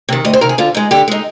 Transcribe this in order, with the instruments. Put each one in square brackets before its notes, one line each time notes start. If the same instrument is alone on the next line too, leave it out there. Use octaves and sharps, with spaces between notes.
[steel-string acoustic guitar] C3 D#3
D2 D#5
C5
C3 D#3 A#4
G#4
D3 F4
G#3 D#4
D3 G4
G#3 D#4